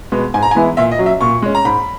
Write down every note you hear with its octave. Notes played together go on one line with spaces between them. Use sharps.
B2 G#3 B3
G#2 G#5
A#5
G#5
E3 G#3 B3 E4
A#2 E5
D#5
F#3 C#4
E5
A#2 C#6
G#3 C#4
A#5
G#2 B5